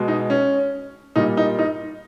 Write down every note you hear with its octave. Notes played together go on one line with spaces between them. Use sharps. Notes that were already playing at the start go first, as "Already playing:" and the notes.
Already playing: B2 G#3
D#4
C#4
A#2 G3 D#4
D#4
D#4